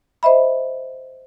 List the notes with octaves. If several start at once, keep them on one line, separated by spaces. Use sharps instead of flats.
C5 D#5 E5 B5